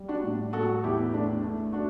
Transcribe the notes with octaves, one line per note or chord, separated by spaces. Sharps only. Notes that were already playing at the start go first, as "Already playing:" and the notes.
Already playing: G3
D4 F#4
A2
A2 F#4 A4
E2 E4 G4
A3 D4
A3
A3 D4 F#4